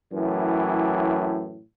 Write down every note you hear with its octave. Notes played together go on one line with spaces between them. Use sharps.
F#2 A2 E3